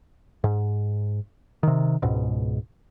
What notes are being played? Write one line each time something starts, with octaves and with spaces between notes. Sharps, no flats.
G#2
C3 D#3
C#2 G#2 B2